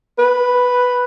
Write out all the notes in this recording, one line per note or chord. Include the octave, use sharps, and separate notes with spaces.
B4